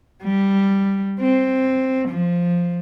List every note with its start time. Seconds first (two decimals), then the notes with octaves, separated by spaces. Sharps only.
0.23 G3
1.20 C4
2.09 F3